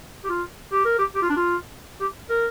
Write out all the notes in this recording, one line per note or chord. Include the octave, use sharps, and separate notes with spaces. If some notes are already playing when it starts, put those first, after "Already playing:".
G4
F4
G4
A#4
G4
G4
F4
D4
F4
G4
A#4